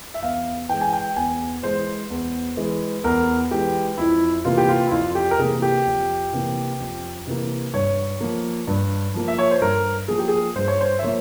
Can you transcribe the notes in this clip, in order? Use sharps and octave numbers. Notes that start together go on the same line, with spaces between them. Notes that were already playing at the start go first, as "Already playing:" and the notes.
E5
E2 F5
E3 G#3 G5
G#5
G5
E2 G#5
E3 G#3 C5
E2
E3 G#3
E2 A#4
E3 G#3 G4
F2 E4
C3 E3 A#3 F4
G4
F4
E4
F2 F4
G4
A#4
C3 E3 A#3 G#4
G4
F2
C3 E3 A#3
F2
C3 E3 A#3
G2 C#5
F3 A#3
G2
F3 A#3
E5
C#5
C5
G2 A#4
F3 A#3 G#4
G4
G#4
G2 C5
C#5
C5
E5
F3 A#3 C#5